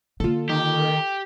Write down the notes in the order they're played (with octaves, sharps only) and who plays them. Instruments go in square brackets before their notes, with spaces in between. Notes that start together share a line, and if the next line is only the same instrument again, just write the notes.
[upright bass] D3 A#3 [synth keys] F4 A4
[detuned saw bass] D#3 [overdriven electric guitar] G4